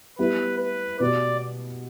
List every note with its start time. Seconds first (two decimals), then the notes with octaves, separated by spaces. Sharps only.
0.19 G3 B3 E4 G4 B4
0.60 B4
1.00 B2 B3 G4 D5